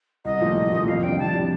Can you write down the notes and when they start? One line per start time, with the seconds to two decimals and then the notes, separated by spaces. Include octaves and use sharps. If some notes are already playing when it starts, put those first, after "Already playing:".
0.25 C2 D#5
0.41 A#2 F3 A3
0.56 C2
0.72 A#2 F3 A3
0.88 F2 F5
1.03 C3 G3 D4 G5
1.19 F2 A5
1.34 C3 G3 D4